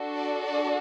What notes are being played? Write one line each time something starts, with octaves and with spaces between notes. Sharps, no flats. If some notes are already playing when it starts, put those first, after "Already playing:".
Already playing: D4 F#4 A4
D5
D5